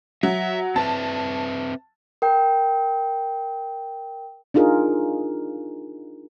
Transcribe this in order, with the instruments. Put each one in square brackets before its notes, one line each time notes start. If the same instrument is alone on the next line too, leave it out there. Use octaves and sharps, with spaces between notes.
[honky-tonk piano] F#3 [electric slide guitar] E5
[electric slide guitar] C4 B4 E5 [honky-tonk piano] A5
[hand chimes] A#4 G5
[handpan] D4 D#4 F4 G#4 A#4